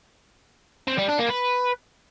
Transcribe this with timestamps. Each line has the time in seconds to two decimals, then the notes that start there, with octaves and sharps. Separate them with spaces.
0.88 C4
0.98 G3
1.09 D4
1.19 A#3
1.30 B4